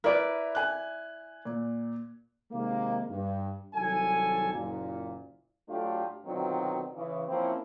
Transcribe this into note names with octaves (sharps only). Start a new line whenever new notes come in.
E4 A#4 B4 D5
G#5 F#6
A#2
C3 D#3 G#3 A#3
G2
C2 D#3 F#3 A4 G#5
F#1 A#2
A2 F#3 A3 D4 F4 G4
B2 D3 D#3 F#3 C4 F4
C#3 E3
F3 A#3 C4 C#4 E4